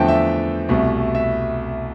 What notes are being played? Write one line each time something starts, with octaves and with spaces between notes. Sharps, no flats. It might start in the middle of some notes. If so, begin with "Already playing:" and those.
Already playing: E2 D3 F3 A3 G5 A5
E5
C2 B2 A3
E5